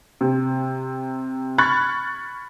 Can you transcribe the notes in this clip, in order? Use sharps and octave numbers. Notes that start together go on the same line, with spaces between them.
C3
B5 C#6 F6 F#6 G#6 A6